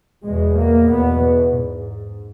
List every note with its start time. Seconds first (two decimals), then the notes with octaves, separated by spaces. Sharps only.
0.25 E2 B2 G#3
0.58 A#3
0.90 E2 B2 B3
1.57 G#2